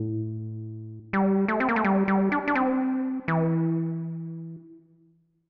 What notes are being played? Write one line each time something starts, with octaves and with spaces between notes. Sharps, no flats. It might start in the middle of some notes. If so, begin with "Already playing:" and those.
Already playing: A2
G3
A3
C4
A#3
A3
G3
G3
D4
D4
C4
E3